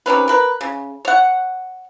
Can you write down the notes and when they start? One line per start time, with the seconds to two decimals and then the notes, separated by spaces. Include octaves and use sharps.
0.06 C3 D#3 C#4 B4
0.28 A#4 B4
0.61 C#3
1.05 C#5 F#5